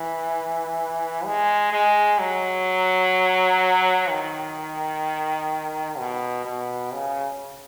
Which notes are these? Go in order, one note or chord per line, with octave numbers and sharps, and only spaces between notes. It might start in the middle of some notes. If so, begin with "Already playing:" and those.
Already playing: E3
G#3
G#3
F#3
D#3
B2
B2
C#3